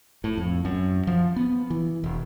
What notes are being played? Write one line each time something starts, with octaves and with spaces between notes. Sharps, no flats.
A2
F2
F#2
F3
B3
E3
E1